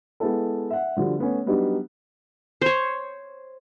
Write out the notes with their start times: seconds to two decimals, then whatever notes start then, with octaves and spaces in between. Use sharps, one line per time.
0.20 G#3 B3 E4 A4
0.70 E5 F#5
0.97 D3 F3 G3 F#4
1.18 A3 B3 C#4
1.46 F#3 G3 B3 D4 D#4 G4
2.62 C5 C#5